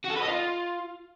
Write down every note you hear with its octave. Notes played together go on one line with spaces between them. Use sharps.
F#4
A4
B4
D#5
F4